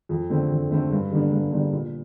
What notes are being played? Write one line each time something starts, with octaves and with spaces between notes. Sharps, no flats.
F2
D3 A3 C4
F2
D3 A3 C4
G2
D3 G3 A#3 D4
G2
D3 G3 A#3 D4
A#2